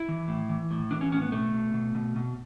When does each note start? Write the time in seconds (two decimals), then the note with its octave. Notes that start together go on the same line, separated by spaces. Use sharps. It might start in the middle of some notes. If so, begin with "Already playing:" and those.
Already playing: E4
0.08 E3
0.28 A2
0.49 E3
0.71 A2
0.91 E3 D4
1.01 C#4
1.12 A2 C#4
1.22 B3
1.32 B2 A3
1.54 B2
1.74 B2
1.95 B2
2.16 B2